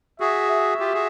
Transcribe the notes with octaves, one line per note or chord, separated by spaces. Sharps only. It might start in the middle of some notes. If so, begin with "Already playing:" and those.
F#4 G#4 E5
E5
F4 G4
F#4 G#4